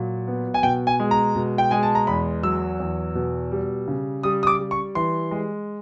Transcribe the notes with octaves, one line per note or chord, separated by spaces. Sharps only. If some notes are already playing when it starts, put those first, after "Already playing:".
Already playing: A#2 F#3
B3
G#5
B2 G5
G#5
G#3
A#5
B2
G5
G#3 G#5
A5
A#5
E2 B5
F#3 E6
E2
B2
G3
C#3
G3 D#6
D#6
D6
G3
C#6
E3 C6
G#3